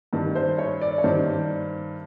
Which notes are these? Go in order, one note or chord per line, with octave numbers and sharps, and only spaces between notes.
G2 D#3
C5
C#5
D5
C#5
G2 D#3 C5